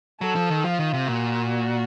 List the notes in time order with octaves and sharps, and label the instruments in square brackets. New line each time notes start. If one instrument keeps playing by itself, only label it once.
[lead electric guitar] F#3 [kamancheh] A4
[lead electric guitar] F3
D#3
[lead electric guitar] F3 [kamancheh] F4
[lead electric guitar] D#3
C3
[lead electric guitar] A#2 [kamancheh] F#4